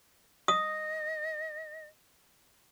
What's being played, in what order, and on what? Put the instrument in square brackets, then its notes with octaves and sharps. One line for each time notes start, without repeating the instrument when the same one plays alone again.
[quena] D#5 [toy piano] D#6